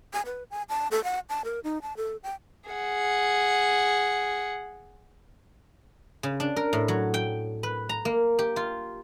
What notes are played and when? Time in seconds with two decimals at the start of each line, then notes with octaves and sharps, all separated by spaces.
0.13 G#5
0.26 B4
0.51 G#5
0.69 A5
0.91 A4
1.04 F#5
1.29 A5
1.45 A#4
1.64 D#4
1.82 A5
1.97 A4
2.23 G5
2.70 G#4 F#5
6.23 C#3
6.40 D4
6.56 A#4
6.73 A2
6.88 F#3
7.14 G5
7.63 B4
7.89 A#5
8.05 A#3
8.39 G4
8.56 F4